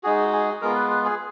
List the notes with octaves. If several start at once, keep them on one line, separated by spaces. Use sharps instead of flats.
G#3 D#4 F#4 G#4
G#4
G#3 B3 F4 A#4
B4
B4
G#4